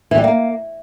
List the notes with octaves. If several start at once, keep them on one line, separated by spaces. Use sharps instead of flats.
E3
G3
A#3